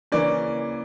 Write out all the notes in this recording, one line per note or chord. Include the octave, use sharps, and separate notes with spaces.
C#3 E3 A#3 C#4 D5